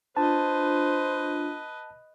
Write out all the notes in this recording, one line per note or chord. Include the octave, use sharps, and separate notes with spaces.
D4 F4 B4 C5 D#5 A5